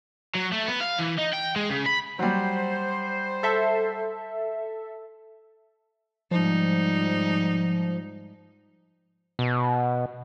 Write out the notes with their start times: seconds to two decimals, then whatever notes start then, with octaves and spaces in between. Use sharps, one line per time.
0.35 F#3
0.52 A3
0.67 B3
0.81 F5
0.99 E3
1.18 D#4
1.33 G5
1.56 G#3
1.70 C#3
1.86 B5
2.19 F#3 G3 C5
3.43 A4 E5 A5
6.31 G#2 F3 G3 D#4
9.39 B2